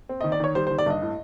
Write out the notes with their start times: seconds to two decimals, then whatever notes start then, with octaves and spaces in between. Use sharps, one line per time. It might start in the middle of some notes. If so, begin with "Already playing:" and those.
0.09 C4
0.21 D#5
0.24 D#3
0.32 D5
0.40 D#3 C#5
0.55 G3 C5
0.67 C5
0.71 D#3
0.78 D5
0.86 G2 D#5
1.02 A2